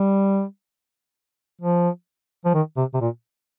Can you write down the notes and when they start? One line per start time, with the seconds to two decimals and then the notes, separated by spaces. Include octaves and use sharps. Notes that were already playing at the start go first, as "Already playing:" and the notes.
Already playing: G3
1.61 F3
2.45 F3
2.54 D#3
2.77 C3
2.94 C3
3.01 A#2